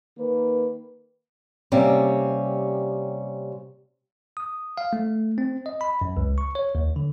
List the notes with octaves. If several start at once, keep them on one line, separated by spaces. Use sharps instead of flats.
D#3 A#3 B4
C3 G3 A#3 C#4
D#6
F5
A3
C4
D#5
B5
F#2
C#2
C#6
C#5
D#2
D3